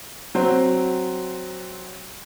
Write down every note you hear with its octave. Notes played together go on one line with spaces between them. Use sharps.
F#3 C4 C5